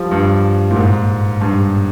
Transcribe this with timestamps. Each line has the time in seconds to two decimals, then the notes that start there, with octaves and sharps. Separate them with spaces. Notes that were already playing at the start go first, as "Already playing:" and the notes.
Already playing: F3 G3
0.11 G2
0.71 A#2
0.76 G#2
1.41 G2